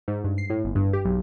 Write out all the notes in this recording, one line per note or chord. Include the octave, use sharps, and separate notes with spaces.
G#2
G2
C7
A2
G1
G2
G4
B1